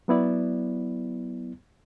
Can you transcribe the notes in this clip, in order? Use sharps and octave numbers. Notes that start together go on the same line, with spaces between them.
F#3 B3 E4 D5